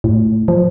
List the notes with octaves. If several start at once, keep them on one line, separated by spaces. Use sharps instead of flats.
A2
F3